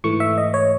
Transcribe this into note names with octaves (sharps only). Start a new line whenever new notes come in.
G#2 E3 A3 C#6
E5
D#5
C#5